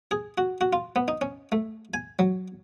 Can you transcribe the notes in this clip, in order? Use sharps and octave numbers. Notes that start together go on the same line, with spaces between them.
G#4
F#4
F#4
F4
B3
D#4
C#4
A3
G#5
F#3